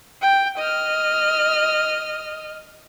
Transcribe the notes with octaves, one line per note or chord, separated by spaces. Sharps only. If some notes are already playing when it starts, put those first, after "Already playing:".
G5
D#5 F6